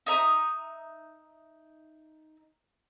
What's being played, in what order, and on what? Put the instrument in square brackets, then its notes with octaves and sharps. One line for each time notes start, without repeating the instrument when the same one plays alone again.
[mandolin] D#4 E5 A#5 D#6